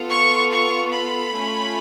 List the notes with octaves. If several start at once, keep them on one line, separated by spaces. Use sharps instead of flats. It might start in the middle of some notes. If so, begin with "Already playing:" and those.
Already playing: B3 F4 A4
C#6
C#6
B5
A3 C#4 F4